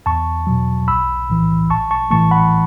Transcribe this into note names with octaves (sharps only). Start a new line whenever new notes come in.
E2 A5 C#6
B2 F#3
B1 B5 E6
A2 E3
A1 A5 C#6
A5 C#6
A2 E3 A3 A5 C#6
F#5 B5